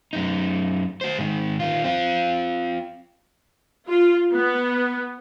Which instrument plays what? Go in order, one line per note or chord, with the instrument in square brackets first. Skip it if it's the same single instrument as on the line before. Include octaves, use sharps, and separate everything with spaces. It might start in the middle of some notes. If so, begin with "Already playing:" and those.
[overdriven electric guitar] F#2 D#4
F#4 C5
G#2 D#3
D#3 F4
C4 F4
[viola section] F4
B3